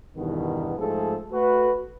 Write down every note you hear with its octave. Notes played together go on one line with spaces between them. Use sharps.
E2 G2 B2 D#3 B3 D#4
G#2 F3 A3 G#4 A4
A3 F#4 B4